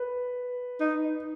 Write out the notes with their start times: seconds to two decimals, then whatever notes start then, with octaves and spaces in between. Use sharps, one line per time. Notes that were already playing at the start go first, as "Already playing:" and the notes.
Already playing: B4
0.80 D#4